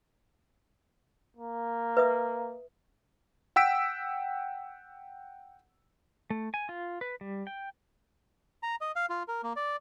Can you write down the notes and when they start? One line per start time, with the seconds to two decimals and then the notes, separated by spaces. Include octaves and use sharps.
1.37 A#3
1.97 B4 E5 D#6
3.56 F#5 G5 E6 B6 D7
6.30 A3
6.54 G#5
6.69 F4
7.01 B4
7.21 G3
7.47 G5
8.63 A#5
8.81 D#5
8.96 F5
9.10 F4
9.28 A#4
9.43 A#3
9.56 D5